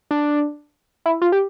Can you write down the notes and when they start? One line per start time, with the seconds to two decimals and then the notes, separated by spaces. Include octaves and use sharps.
0.11 D4
1.06 E4
1.22 F4
1.32 G4